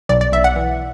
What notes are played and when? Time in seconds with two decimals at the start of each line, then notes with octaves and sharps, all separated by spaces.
0.09 B1 D5
0.21 D5
0.32 B1 E5
0.44 F#5
0.56 E3